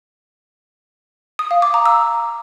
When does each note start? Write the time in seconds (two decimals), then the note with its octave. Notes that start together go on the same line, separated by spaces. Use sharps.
1.39 D#6
1.51 F5
1.62 D6
1.74 A#5
1.86 E6